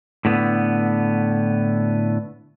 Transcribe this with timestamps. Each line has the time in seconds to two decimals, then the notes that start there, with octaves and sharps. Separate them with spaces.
0.25 A2 D3 B3